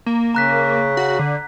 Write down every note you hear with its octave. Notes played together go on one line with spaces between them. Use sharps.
A#3
C#3 A#5 F#6 B6
F#4
D3